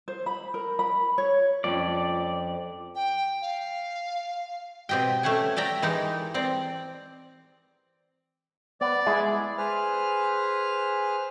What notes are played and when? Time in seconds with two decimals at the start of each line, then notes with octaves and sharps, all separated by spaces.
0.08 C5
0.26 B5
0.54 A#4
0.79 B5
1.18 C#5
1.64 F2 C#4 D5
2.95 G5
3.42 F5
4.89 B2 C4 G4 D#5 G5
5.23 A3 C#4 G4 F#5 G#5
5.56 D5 E5 G5 A#5
5.82 E3 G#3 D#4 G4 A#4
6.34 C4 D5 A#5
8.81 B3 D5
9.06 G#3 E4 G#4
9.58 G#4 B4 C5 F6